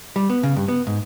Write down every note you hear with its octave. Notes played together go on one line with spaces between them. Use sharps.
G3
B3
C#3
G2
B3
G#2